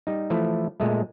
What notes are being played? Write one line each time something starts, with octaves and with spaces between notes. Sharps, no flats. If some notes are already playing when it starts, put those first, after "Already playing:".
G3 D#4
E3 F3 A3 E4
A#2 G#3 A3